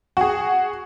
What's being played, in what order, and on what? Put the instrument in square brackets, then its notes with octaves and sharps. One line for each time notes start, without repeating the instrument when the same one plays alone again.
[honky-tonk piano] F#4 G#4